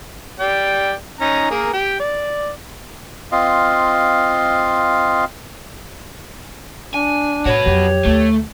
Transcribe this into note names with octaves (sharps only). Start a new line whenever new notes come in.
G4 D5 G5
C#4 D#4 A#5
A#3 G#4 A#4
G4 G5
D5
C4 F4 D#5 F5
D4 G#5
A2 G3 F#4 B4 C#5
F2 F#3 G4
D2 A3